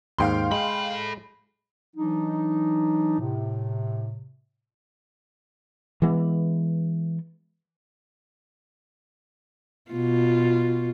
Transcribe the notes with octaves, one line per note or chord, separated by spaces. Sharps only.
D#2 G#2 F5 G5 C6
G#3 A4 B5
E3 F#3 D4 D#4
A2 C3
E3 G#3 B3
B2 F4